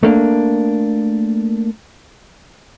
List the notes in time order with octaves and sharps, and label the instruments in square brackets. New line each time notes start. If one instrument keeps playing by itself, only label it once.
[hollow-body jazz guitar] A3 A#3 D4